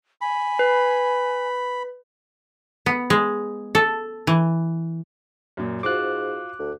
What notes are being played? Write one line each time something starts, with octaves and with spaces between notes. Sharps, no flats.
G#5 B5
B4
B3
G#3
A4
E3
F#2 A#2
G#2 F4 F#4 C5 D6 F#6
D2